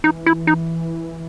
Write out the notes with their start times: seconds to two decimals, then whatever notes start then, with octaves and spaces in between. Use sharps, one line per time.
0.04 E3 D#4
0.26 E4
0.47 D#4